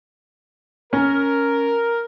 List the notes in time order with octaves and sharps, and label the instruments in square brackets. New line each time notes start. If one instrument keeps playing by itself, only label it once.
[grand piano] C#4 [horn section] A#4